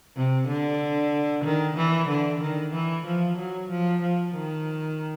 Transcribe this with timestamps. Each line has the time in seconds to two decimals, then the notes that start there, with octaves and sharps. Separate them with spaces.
0.16 C3
0.48 D3
1.44 D#3
1.77 E3
2.09 D3
2.41 D#3
2.74 E3
3.07 F3
3.38 F#3
3.70 F3
4.02 F3
4.34 D#3